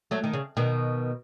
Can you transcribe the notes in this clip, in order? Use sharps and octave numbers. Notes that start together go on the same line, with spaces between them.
F#3 A3
D#3
C#3
B2 D#3